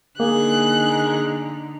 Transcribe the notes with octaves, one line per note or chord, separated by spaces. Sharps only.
D3 A#3 D#4 G#4 F#6